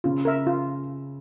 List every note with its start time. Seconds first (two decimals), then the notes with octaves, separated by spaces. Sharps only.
0.04 C#3 F4
0.25 A#4 E5
0.47 F4